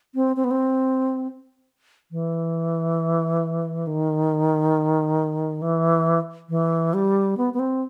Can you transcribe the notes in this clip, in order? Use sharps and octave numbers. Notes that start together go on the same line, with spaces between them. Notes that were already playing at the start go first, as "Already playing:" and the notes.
C4
C4
B3
C4
E3
D#3
E3
E3
G3
B3
B3
C4